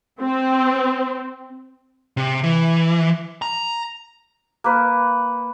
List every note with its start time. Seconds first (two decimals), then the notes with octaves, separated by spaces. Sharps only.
0.20 C4
2.17 C3
2.44 E3
3.42 A#5
4.64 A#3 B4